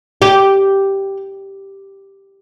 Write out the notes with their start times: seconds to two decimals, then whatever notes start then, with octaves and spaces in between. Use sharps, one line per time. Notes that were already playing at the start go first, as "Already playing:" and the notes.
0.22 G4